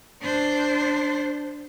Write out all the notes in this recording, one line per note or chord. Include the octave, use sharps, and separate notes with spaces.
D4 C5